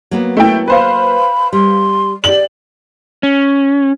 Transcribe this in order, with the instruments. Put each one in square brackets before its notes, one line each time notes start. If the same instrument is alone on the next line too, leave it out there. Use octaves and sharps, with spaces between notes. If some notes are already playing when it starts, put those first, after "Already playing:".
[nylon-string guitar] F#3 A#3 B3
[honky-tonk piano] A3 E4 G5
[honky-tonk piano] B4 C5 F5 [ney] B5
[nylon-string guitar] G3 [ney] C6
[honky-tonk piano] G4 F#7 [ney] D5
[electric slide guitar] C#4